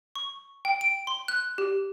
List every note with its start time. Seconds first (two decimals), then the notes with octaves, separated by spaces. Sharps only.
0.16 C#6
0.65 G5
0.81 D7
1.07 C6
1.28 F#6
1.58 G4